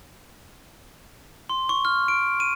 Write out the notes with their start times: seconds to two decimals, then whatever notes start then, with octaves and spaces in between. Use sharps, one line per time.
1.49 C6
1.69 C#6
1.85 F6
2.08 D7
2.40 D#7